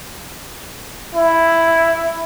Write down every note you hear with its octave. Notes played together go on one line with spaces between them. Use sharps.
E4